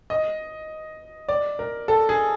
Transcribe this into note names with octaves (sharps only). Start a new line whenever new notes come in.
D#5
D5
A#4
A4
G#4